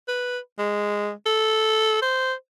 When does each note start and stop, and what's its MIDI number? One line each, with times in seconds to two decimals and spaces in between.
0.08 0.38 71
0.59 1.11 56
1.26 2.00 69
2.02 2.33 72